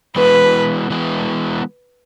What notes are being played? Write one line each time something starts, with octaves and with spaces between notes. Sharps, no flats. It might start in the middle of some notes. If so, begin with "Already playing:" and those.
E3 G#3 B3 B4
E3 G#3 B3